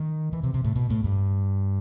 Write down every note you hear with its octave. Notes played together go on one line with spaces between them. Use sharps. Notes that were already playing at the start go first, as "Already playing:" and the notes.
Already playing: D#3
E3
C3
C3
A2
B2
A2
G2